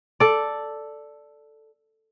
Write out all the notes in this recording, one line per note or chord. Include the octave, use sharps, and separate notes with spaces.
A4 D5